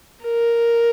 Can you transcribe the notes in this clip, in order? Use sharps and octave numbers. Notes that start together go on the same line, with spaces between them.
A#4